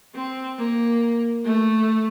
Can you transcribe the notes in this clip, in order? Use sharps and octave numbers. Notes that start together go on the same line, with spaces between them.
C4
A#3
A3